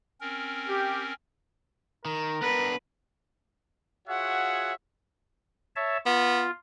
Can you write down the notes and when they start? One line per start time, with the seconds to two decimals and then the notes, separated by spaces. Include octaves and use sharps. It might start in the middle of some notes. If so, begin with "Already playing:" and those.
0.21 C4 C#4 A#4
0.68 G4
2.05 D#3 A#4
2.42 B3 D4 B4
4.08 F4 F#4 G#4 C#5 E5 F#5
5.76 C#5 E5 A5
6.06 B3 F4